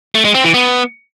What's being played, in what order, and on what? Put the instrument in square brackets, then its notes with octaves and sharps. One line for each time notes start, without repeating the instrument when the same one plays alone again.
[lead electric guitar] A3
G#3
C4
E3
B3